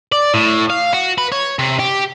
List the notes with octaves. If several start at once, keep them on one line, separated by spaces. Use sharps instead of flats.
D5
A2
F5
F#4
B4
C#5
C3
G4